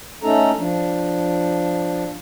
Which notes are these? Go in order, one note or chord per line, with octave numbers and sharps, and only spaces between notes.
A3 C#4 D#4 A4 A#5
F3 D4